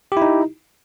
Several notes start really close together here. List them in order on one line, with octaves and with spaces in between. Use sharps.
G4 E4 D#4